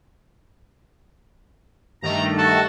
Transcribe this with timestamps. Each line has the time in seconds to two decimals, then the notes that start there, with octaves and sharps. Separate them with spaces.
2.02 G2 D#3 A3 A#5
2.38 F#4 A4 A5